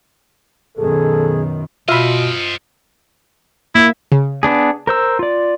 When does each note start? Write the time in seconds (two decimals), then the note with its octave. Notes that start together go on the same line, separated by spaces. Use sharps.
0.77 F#2 B2 D#3 G#4 A4
1.88 B2 F4 C5 D#5 E5 B5 F6
3.75 A#3 E4 E5
4.12 C#3
4.43 B3 D4 G#4
4.87 A#4 C5 E6
5.19 F4 D5